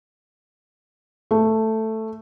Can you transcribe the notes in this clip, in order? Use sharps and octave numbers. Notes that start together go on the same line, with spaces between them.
A3